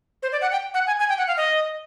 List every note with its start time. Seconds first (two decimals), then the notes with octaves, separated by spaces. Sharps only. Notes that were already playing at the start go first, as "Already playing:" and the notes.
0.23 C5
0.32 D5
0.42 F#5
0.52 G5
0.74 F#5
0.87 G#5
0.99 G#5
1.09 G5
1.18 F#5
1.27 F5
1.37 D#5